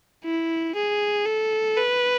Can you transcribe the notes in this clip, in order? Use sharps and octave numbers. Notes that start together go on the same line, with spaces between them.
E4
G#4
A4
B4